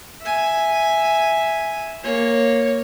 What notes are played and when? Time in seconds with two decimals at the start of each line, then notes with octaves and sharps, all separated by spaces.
0.22 E5 G#5
2.03 A#3 C#5